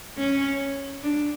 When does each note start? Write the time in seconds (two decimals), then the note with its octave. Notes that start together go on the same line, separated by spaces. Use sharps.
0.18 C#4
1.03 D4